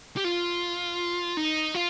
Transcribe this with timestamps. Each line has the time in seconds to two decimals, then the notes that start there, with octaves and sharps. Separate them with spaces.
0.17 G4
0.24 F4
1.37 D#4
1.75 F4